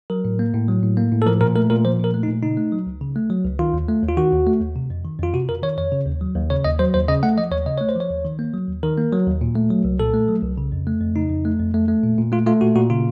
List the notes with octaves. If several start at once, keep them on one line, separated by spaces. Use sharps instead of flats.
F#3 A#4
A2
A#3
A2
F#3
A2
A#3
A2
A4
F3 A#4
A#2 A#4
A3 A#4
A#2 A#4
F3 C5
A#2 A#4
A3
D#4
A#2
C#3 D#4
A3
F#3
C#2
C#3
A3
F#3
C#2
D#3 F4
D#2
A3
D#2
F4
D#3 F#4
D#2
A3
D#2
C3
F2
D#3
F2 F4
C3 F#4
F2 A#4
D#3 C#5
F2 C#5
C#3
D#2
F#3
D#2
C#3 C#5
D#2 D#5
F#3 C5
D#2 C5
C#3 D#5
A3 F#5
F3 D#5
D#2 C#5
C#3 D#5
A3 C#5
C5
F3 C#5
D#2
D#3
A#3
F#3
D#2
D#3 A#4
A#3
F#3
D#2
A#2
A3
F#3
C2
A#2 A4
A3
F#3
C2
C#3
F2
A3
F2
C#3 D#4
F2
A3
F2
A3
A3
A#2
A#2
A3 F4
A3 F4
A#2 F#4
A#2 F#4
C#3 F4